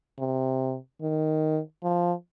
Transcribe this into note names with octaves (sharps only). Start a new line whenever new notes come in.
C3
D#3
F3